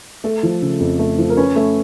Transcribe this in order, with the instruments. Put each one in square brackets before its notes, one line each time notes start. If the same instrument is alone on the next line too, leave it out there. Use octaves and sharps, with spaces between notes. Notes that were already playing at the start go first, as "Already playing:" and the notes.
[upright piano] A3 A4
F3
C#3
F2
A3
F3
A#4
C#4 B4
A3